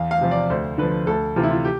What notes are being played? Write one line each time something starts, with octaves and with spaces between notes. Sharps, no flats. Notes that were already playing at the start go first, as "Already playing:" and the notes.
Already playing: E2 F5
F5
C3 F3
D5
D2 C5
D3 F3 B4
D2 A4
C3 E3 F4
E4
F4
G4